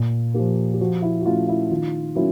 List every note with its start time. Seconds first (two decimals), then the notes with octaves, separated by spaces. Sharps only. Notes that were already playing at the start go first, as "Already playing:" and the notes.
Already playing: A#2
0.34 F3 A#3 G4
0.74 G4
0.81 F3 F#4
1.02 E4
1.20 F#4
1.25 A3 C#4 E4 F4
1.49 E4
1.70 D#3 F4
2.15 F#3 A#3 C#4 E4